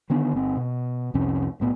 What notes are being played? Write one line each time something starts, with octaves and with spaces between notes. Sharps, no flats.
D3 D#3 B3 D4
G1 C4
B2
C2 F2 C3 C#4
B1 A2 B3